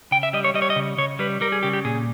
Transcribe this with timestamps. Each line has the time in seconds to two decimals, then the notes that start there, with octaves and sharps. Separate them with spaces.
0.11 C#3 G5
0.23 E5
0.33 G3 D#5
0.44 C#5
0.54 G3 D#5
0.62 C#5
0.70 D#5
0.76 C#3
0.98 C#3 C#5
1.19 G3 B4
1.41 G3 A#4
1.52 G#4
1.63 C#3 G4
1.73 G4
1.85 A#2 G#4